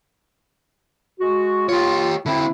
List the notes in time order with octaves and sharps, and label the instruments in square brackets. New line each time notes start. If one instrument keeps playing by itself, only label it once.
[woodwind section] G#3 F#4
[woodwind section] F4 [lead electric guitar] G4 C#5
[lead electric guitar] D3 C4 [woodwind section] E4